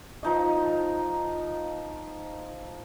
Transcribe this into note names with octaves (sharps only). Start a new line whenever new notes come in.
F3 D#4 D#5